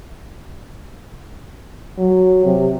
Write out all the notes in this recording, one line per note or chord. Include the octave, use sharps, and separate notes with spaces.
F#3
C3